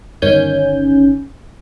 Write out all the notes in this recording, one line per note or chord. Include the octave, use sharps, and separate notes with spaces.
G1 D#3 C#4 G#5 G6